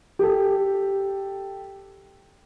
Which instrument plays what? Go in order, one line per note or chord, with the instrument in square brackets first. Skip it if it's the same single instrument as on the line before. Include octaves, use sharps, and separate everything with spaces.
[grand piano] G4 A4